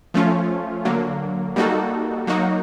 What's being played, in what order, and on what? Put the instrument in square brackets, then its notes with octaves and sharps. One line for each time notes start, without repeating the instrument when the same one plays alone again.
[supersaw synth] F3 A3 C#4 F4
D3 F#3 A#3
G3 A#3 D#4 F#4 A4
F#3 A#3 D#4 F#4